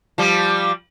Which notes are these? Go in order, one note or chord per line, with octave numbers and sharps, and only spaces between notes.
F3 G3